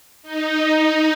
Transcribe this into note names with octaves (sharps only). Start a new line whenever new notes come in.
D#4